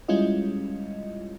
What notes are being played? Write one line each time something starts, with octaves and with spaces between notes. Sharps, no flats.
G3 G#3 C#4 E4 F4 D#5